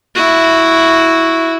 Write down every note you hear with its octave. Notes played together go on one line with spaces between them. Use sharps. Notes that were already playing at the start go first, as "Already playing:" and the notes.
E4 F#4